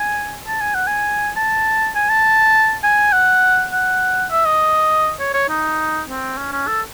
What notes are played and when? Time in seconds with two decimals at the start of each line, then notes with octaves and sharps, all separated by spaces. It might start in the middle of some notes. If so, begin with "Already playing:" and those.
Already playing: G#5
0.47 A5
0.61 G#5
0.74 F#5
0.87 G#5
1.36 A5
1.95 G#5
2.09 A5
2.83 G#5
3.13 F#5
3.73 F#5
4.31 E5
4.45 D#5
5.19 C#5
5.34 C#5
5.49 D#4
6.08 C4
6.37 C#4
6.52 C#4
6.67 A4